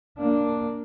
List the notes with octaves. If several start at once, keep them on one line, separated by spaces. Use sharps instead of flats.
A#3 D4